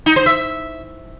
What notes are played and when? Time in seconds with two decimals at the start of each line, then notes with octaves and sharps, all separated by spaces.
0.06 D#4
0.16 C5
0.26 E5